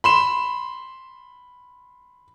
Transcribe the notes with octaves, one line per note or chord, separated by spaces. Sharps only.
B5 C6 E7